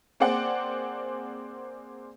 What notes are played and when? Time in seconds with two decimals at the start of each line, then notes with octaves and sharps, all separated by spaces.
0.20 A#3 C4 G#4 D5 F#5 G5